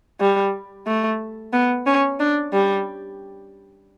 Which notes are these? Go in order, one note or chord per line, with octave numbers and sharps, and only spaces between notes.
G3
A3
B3
C#4
D4
G3